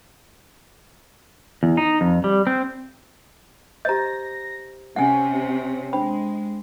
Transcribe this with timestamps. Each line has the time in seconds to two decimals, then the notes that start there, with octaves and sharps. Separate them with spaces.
1.63 E2
1.77 D#4
2.01 F2
2.24 G3
2.47 C4
3.85 G4 C5 D#5 A#5 G6 A#6
4.96 C3 C#4 F#5 G#5
5.93 G#3 D4 C5 G5 B5